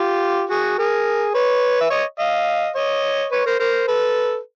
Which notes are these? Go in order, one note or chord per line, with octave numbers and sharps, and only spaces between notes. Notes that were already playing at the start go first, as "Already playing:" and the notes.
Already playing: F4 G4
F#4 G#4
G#4 A#4
B4 C#5
E5
C#5 D#5
D#5 F5
C#5 D#5
B4 C#5
A#4 C5
A#4 C5
A4 B4